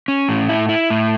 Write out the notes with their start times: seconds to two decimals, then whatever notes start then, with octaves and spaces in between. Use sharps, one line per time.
0.08 C#4
0.29 A2
0.49 E4
0.69 E4
0.90 A2